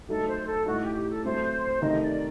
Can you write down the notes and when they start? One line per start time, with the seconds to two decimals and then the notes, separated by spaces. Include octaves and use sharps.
0.09 F#3 A3 D#4 A4
0.28 C5
0.48 A4
0.66 A2 A3 D#4 F#4
0.80 G4
0.95 G4
1.09 A4
1.24 F#3 A3 C4 C5
1.82 C3 D#3 A3 D#4 D#5
2.01 D5